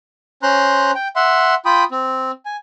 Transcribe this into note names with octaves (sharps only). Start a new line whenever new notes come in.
C#4 C5 A#5 C6 F#6
G5
E5 F#5 C6
F4 G5 B5 D#6
C4
G#5